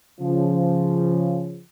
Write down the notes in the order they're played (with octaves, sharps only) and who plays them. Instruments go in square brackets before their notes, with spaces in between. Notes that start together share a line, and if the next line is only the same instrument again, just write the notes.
[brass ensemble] C#3 F3